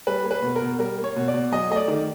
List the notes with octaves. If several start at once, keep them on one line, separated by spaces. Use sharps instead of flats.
G3 B4
A#3
B4
B2
A#4
B2
G3 A#4
A#3
C#5
B2
D5
B2
F#3 D#5
A3 D#5
D5
D#3